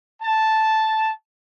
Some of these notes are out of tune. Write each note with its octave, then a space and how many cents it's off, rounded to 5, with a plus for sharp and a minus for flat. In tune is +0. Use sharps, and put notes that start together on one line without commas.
A5 -5